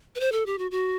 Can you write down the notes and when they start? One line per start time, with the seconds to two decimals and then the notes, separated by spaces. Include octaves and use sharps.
0.15 B4
0.20 C5
0.32 A4
0.46 G4
0.58 F#4
0.71 F#4